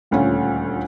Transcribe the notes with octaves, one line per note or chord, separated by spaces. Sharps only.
D#1 D2 A3 C#4 F4